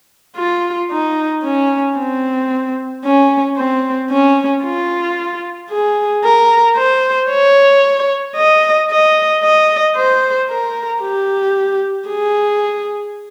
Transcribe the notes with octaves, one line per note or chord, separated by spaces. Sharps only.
F4
D#4
C#4
C4
C#4
C4
C#4
F4
G#4
A#4
C5
C#5
D#5
D#5
D#5
C5
A#4
G4
G#4